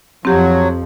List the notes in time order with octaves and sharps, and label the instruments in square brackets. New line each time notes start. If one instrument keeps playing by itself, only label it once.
[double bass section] F2 F3 [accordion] F#3 [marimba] C4 G4